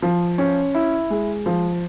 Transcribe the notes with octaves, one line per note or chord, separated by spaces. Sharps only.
F3
C#4
E4
G#3
F3